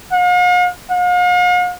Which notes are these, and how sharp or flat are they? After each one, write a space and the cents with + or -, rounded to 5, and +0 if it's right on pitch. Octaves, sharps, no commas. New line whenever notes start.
F5 +45
F5 +45